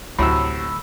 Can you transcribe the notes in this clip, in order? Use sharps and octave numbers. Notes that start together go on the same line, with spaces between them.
D2 A2 C3 F#3 B5 E6